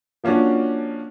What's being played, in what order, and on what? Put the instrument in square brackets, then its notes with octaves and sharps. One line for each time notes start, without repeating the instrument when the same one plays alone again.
[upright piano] F3 A#3 C#4 D4 F#4